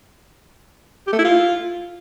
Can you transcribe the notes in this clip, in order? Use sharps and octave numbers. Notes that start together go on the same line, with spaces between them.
G4
A3
E4
F4